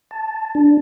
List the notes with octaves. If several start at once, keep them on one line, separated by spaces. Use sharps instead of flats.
A5
D4